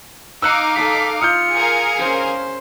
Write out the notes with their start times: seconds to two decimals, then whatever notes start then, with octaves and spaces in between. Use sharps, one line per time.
0.42 D#4 F5 D6 E6 F#6 C#7
0.75 A4 B6
1.21 F4 D#6 F6 G6 C#7
1.54 G#4 A#4 F5
1.98 C#4 C5